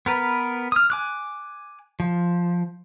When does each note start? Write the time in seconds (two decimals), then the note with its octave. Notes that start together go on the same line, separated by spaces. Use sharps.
0.06 B3 A#4 B4
0.72 D#6 F6
0.90 G#5 D6 F#6
2.00 F3